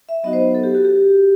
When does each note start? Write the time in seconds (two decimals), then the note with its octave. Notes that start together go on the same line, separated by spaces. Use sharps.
0.09 E5
0.23 F#3 B3 D#4 F#4 D#5
0.33 C5
0.55 A4
0.64 G4
0.75 F#4
0.85 G4